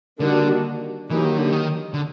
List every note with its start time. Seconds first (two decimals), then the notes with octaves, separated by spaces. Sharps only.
0.20 D3 D#3 G3 A#3 D4 F#4
1.10 E3 F#3 A#3 D#4 G4
1.24 D#3
1.38 D3
1.52 D#3
1.94 D3